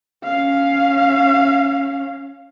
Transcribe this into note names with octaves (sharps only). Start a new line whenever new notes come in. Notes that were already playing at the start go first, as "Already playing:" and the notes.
C#4 F5